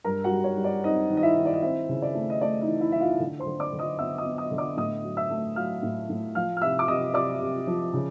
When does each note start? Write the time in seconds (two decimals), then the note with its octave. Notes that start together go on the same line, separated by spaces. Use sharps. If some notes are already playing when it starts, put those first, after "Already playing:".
0.05 G2 A#4 A#5
0.24 F#4 F#5
0.31 G3
0.44 C#5
0.57 G3
0.64 D5
0.83 C4 D#4 D#5
1.10 D#3
1.17 D#5
1.23 E4 E5
1.37 D#3
1.46 D5
1.54 D#5
1.62 C4 E4 E5
1.89 C#3
2.02 D5
2.15 A3
2.30 D#5
2.41 A3 D5
2.61 D#4 D#5
2.67 E3
2.81 E4 E5
2.92 E3 E5
3.01 F4 F5
3.20 D3
3.39 C5 C6
3.46 D3
3.60 D5 D6
3.73 D3
3.79 D#5 D#6
3.99 B3 E5 E6
4.18 D#5 D#6
4.25 B3
4.38 D#5 D#6
4.51 D3
4.58 D5 D6
4.77 A2 D#5 D#6
5.04 F#3
5.17 E5 E6
5.30 A3
5.56 F#3 F5 F6
5.83 A2
6.09 A2
6.35 F3 F5 F6
6.57 F6
6.62 C3 E5 E6
6.79 D6
6.88 C3 D#5 D#6
7.14 C3 D5 D6
7.41 C3
7.67 F3
7.93 C#3